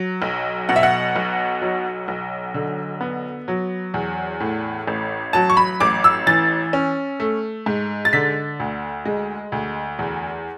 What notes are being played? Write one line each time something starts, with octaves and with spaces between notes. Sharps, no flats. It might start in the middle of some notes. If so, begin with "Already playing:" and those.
Already playing: F#3
B1
B2 F#5
E5
F#5
B1
F#3
B1
D3
B3
F#3
E2
A2
A1
F#3 A5
C#6
B5
A1 D6
E6
E3 A6
C#4
A3
G#2
A6
D3 B6
D2
G#3
D2
E2